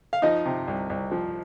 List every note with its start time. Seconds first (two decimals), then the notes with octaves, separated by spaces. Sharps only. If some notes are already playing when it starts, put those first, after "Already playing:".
0.13 F5
0.22 F3 D#4 D#5
0.45 C3
0.68 C2
0.90 C2
1.12 F3